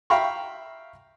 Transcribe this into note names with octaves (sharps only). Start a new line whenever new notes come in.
E5 F5 G5 A#5 B5 C#6